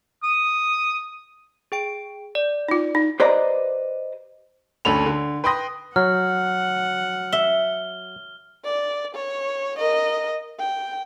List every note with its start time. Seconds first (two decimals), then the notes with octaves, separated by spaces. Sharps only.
0.23 D#6
1.72 G#4 G5 D7
2.35 D5
2.69 D#4 F4
2.95 D#4
3.20 G4 B4 C5 D5 D#5 A#5
4.85 D2 C#4 A4 B5 F7
5.06 D3
5.44 B4 G5 B5 C6 D#6 A#6
5.96 F#3 F#5 F6
7.33 E5 G7
8.65 D5
9.15 C#5
9.79 A#4 D#5
10.59 G5